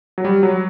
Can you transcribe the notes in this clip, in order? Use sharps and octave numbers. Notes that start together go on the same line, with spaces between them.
F#3
G3
F#3